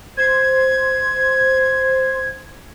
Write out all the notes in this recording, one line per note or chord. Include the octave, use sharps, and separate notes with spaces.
C5 G#6